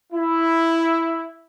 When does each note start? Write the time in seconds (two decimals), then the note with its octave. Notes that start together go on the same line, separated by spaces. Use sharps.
0.13 E4